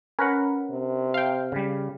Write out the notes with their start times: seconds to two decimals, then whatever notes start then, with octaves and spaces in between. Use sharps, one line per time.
0.19 C#4 A#4 B4 F#5
0.71 C3
1.14 F5 G5
1.52 C#3 G3